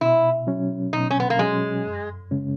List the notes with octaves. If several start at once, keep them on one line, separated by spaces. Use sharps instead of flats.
B2 E4
F#3 C#4
B2 D#4
C#4
B3
A#3
F#3 G#3 C#4
F#2
C#3 G#3 C#4